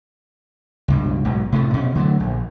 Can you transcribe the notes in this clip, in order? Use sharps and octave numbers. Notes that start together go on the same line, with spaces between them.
C#2 G2 B2
B1 G#2 B2
A2 C3 A3
B2 C#4
D3 F#3 G3 A3
A#1